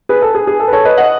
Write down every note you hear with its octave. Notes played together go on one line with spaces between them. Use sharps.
G#4 B4
A4
G#4
G#4
A4
B4
A4 C#5
B4 D#5
D#5 F#5